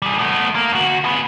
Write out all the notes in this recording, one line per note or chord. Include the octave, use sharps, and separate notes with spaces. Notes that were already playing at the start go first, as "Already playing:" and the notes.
G3 G#4
A3 B3
A#3
D2 F#4
G#4 B4